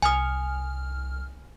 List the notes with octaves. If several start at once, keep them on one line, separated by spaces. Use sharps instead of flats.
C2 G#5 D#6 F6